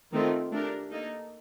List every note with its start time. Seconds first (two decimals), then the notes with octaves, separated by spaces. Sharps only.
0.12 D#3 A3 C4 F4
0.52 A3 D4 G4 A#4
0.91 A#3 D#4 A4